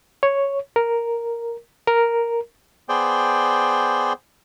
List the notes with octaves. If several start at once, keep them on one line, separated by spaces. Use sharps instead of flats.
C#5
A#4
A#4
B3 G#4 C5 D5 G5